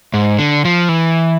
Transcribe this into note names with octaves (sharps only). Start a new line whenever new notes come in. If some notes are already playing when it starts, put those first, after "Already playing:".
G#2
D3
F3
E3